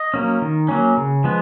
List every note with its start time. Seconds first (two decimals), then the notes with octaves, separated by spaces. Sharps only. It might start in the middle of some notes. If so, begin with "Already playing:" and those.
Already playing: D#5
0.14 F#3 A#3 C#4
0.42 D#3
0.68 F#3 A#3 C#4
0.97 C#3
1.24 F3 G#3 B3